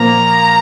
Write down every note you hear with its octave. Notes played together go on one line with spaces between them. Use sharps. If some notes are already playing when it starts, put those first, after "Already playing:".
Already playing: A#2 F3 A#3 A#5